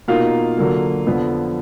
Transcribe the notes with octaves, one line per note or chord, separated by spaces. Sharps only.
B2 A#3 D#4 F4 F5
D3 F#3 A#3
F2 D3 F3 B3